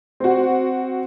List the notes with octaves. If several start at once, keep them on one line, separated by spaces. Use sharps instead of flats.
C4 F#4